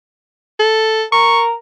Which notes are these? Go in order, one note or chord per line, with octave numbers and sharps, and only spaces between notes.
A4
A#4 C#6